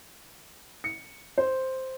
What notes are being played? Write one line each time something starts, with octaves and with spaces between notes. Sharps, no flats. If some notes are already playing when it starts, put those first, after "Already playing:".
C#7
C5